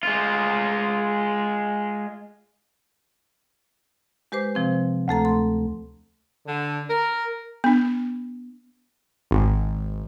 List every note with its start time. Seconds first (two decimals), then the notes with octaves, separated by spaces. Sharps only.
0.03 G#3 F4
4.32 G#3 G4 B4 C5 D6
4.55 C3 F3 C4
5.08 D2 A3 A4 A#5
5.25 C6
6.46 D3
6.89 A#4
7.64 B3 D4
9.31 G#1